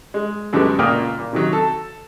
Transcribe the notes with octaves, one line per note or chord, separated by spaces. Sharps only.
G#3
F#2 D3 G3 G#3 B3
C#2 A#2 A#3 G5 D#6 F6
A#2
C3 D#3 F#3
A4